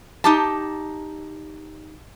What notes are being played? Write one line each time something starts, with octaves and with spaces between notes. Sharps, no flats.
D#4 G4 A5